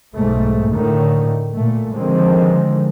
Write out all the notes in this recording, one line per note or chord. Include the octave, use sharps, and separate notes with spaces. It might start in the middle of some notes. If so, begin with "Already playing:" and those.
B1 G#2 A3
A2 D3 D#3 A3
A#2 A3
D3 D#3 F3 G#3 C4